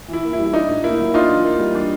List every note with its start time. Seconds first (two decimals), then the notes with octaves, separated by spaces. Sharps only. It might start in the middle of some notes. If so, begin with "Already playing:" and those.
0.08 E3
0.13 E4
0.24 A#3
0.33 E4
0.39 G3
0.53 D4 D#4
0.68 A2
0.84 A#3 E4
0.99 F#3
1.14 D4 D#4 F4
1.30 E3
1.44 A#3
1.59 G3
1.75 D4